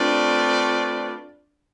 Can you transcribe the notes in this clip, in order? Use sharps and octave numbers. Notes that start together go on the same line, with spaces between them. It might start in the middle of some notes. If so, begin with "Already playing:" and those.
Already playing: A3 C4 D4 F4 B4 D5